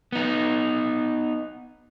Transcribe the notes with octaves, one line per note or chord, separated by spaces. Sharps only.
B3 D#4